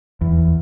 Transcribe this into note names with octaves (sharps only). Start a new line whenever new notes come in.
E2